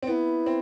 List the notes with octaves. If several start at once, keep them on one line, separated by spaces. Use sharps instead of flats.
C4
B3 E4
C4